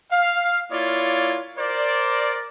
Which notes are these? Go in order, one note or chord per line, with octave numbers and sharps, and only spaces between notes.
F5
A#3 E4 F4 C#5 D5
A#4 C5 D5